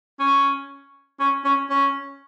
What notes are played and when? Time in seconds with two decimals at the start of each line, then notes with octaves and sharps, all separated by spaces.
0.20 C#4
1.20 C#4
1.44 C#4
1.70 C#4